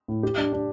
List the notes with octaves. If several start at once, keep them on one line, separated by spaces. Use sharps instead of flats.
A2
G4
D4
D4